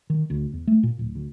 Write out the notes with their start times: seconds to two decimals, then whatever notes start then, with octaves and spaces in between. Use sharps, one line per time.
0.10 D#3
0.30 D2
0.53 E2
0.67 A3
0.83 A#2
0.99 D1
1.15 D2